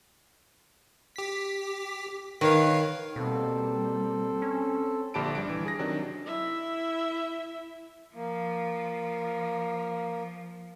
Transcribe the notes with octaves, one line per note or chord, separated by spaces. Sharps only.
G4 B6
D#3 B4 C#5 F5
B2 G3 A#3 C4 A4
C#4
A#1 D3 G4 A5 B5 D7
G1 G3 D4 D7
E3
G#4 A#6
C3 D#3 F#3 D4
E4 E5
F3 A#3